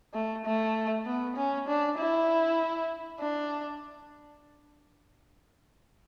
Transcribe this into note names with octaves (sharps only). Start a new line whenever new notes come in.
A3
A3
B3
C#4
D4
E4
D4